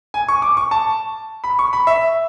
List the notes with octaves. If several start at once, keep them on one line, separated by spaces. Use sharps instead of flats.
G#5
C#6
D6
C#6
A5
B5
C#6
B5
E5